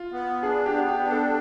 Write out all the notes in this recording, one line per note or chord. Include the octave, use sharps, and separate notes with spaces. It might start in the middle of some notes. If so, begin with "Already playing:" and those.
Already playing: F4
B3
D4 G#4
G4
B3
G4
D4
A4